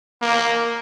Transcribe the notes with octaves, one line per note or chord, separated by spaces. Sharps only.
A#3